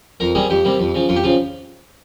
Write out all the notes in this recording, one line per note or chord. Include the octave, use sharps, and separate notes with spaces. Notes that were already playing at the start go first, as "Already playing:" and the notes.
F2 A#4
C3 G3 A#3 G#4
F2 G4
C3 G3 A#3
F2
C#3 F3
F2 F4
G4
C#3 F3 F4